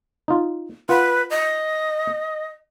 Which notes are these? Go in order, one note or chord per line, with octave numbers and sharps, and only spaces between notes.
D#4 F4
F4 B4 F#5
D#5